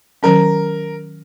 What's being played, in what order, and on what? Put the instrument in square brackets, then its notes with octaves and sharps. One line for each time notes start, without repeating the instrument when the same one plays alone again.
[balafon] D#3 F#3 C#4 [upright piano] A#4